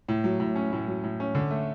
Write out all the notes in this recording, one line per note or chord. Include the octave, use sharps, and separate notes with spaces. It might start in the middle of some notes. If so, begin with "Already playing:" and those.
A2
F#3
A2
C#4
A2
F#3
A2
C#4
D3
A3